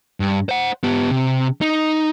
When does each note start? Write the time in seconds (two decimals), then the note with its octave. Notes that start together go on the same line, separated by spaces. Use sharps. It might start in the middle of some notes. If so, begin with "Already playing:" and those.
0.20 G2
0.49 C5 F#5
0.83 B3 G4
1.11 C3
1.61 D#4